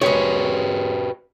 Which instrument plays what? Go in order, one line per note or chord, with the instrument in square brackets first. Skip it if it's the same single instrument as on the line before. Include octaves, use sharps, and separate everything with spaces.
[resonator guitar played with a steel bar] G#3 C#5 [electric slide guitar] F#4 G4 B4